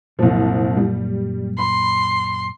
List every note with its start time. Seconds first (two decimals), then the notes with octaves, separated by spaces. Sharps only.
0.19 C2 F#2 A#2 F3
0.77 G3
1.59 B5 C6